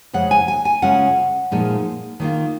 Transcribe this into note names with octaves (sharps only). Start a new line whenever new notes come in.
F2 C#3 G#3 F#5
G#5
G#5
G#5
C#3 G#3 C#4 F4 F#5
A#2 F3 G#3 D#4
D#3 A#3 F4